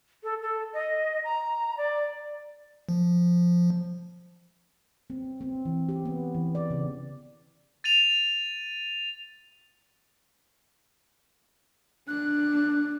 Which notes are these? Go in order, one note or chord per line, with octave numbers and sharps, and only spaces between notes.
A4
A4
D#5
A#5
D5
F3
C4
C4
E3
G4
B3
E3
D5
C#3
A6 D#7 F7
D4 F#6